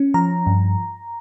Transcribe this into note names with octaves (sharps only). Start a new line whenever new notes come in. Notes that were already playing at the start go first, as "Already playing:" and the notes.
Already playing: C#4
F3 A#5
G2